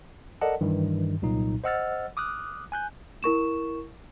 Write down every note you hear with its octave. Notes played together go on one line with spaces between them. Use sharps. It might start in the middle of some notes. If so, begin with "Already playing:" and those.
A4 A#4 D5 D#5 F#5 A5
G2 D#3 E3
C2 A#2 F#3 D#4
C5 D#5 F#5 E6 F6 A6
D6 D#6 F6 F#6
G#5 F#6 G6
E4 A#4 C#6 E7